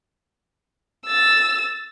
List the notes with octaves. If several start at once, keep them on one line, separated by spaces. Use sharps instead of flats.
E6 A6